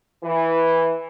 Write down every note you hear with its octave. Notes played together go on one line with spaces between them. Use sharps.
E3